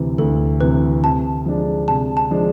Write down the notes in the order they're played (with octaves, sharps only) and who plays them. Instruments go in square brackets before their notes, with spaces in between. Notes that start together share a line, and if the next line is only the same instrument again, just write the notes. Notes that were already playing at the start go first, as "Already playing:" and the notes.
Already playing: [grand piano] D2 C3 E3
[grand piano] D2 [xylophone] A4
[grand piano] C3 E3 [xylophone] B4
[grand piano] C3 [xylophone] A5
[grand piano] F3 G#3 D4
[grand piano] C3 [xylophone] A5
[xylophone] A5
[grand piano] F3 G#3 D4